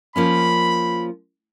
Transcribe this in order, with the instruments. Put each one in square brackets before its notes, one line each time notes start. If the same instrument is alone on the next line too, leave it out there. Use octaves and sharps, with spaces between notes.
[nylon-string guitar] F3 A#3 C#4 [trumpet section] B5